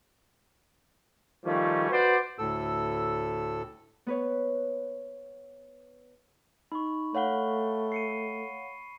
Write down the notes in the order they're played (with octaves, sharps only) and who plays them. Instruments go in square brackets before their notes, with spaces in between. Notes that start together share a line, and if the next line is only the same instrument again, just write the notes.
[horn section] D#3 F3 G3 A3 C#4
F#4 B4 C5 D5
[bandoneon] D2 A2 A4 E6
[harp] B3 B4 C#5
[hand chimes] D#4 [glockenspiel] B5 C#6
[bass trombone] A3 [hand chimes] C#5 F5 F#5 [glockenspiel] B5 G7
[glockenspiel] C7 C#7 D#7